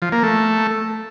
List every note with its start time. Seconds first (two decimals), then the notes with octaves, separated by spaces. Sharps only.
0.02 F3
0.12 A#3
0.23 A3